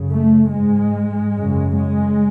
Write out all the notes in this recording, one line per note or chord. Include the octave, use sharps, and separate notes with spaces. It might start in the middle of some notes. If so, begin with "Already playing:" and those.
Already playing: F#2 C#3
A3
G#2 G#3
F#2 C#3
G#3